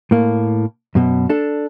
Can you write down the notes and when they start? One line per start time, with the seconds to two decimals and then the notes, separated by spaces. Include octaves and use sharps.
0.11 A2 A#3
0.95 F#2 B2
1.30 D4 A4